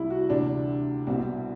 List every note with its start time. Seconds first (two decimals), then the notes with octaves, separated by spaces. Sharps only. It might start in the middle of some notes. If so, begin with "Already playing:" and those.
Already playing: C2 C3 E4
0.10 F#4
0.29 D2 C3 E3 G3 D4
1.07 C2 B2 G3 C4